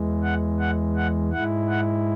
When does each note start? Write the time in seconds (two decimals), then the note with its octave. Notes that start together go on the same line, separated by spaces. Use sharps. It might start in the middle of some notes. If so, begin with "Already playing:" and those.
Already playing: E2 E3 G#3
0.23 F#5
0.60 F#5
0.96 F#5
1.33 G#2 G#3 E4 F#5
1.69 F#5